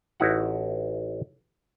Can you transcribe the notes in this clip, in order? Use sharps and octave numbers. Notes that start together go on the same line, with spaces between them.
A1 D#4 E4 F#4 F#5